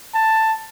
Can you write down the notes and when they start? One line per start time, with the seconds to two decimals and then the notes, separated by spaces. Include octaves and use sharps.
0.14 A5